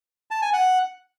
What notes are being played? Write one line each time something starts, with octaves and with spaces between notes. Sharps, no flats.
A5
G#5
F#5